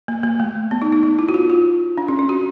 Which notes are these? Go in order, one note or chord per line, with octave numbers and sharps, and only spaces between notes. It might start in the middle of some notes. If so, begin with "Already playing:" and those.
A#3
A#3
A3
B3
D#4
D#4
D#4
E4
F#4
F4
F4
D4
C#4
C#4
F#4